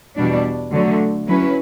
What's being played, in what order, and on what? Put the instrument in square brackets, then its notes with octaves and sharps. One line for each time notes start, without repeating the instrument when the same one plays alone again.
[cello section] E2 B2 G3 D4
D3 F#3 A3
F#3 C#4 E4 B4